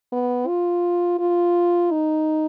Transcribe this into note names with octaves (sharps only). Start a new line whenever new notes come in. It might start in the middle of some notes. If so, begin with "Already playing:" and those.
B3
F4
F4
D#4